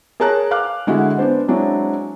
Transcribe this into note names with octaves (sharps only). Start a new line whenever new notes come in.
G#4 A#4 C#5 A5 A#5 F#6
F5 D6 F6 F#6
D3 G#3 E4 F#4
B3 D4 C5
F#3 G#3 C4 D4 E4